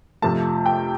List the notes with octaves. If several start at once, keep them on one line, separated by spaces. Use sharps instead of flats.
F2 C3 F3 A3 A5
G5